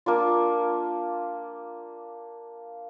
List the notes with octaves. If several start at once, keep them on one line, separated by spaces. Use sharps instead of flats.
A#3 D4 F4